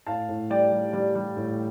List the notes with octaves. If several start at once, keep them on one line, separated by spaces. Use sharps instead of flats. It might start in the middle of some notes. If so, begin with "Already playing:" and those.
A2 F5 A5
A2
G3 D5 G5
G3
G3 D5
G3
A2